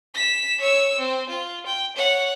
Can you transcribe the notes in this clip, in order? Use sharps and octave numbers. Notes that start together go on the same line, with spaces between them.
B6 E7
C#5 E6
C4
F4
G5
C#5 F#5